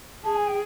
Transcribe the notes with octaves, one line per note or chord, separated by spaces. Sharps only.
G#4 A5
G#5
G5